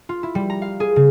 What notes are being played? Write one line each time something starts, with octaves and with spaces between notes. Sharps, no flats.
F4
E4
G3
A#5
F5
G#4
C#3